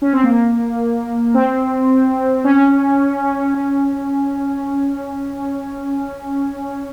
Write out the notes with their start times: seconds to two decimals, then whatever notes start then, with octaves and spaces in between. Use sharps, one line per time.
0.02 C#4
0.13 C4
0.24 A#3
1.34 C4
2.44 C#4
3.54 C#4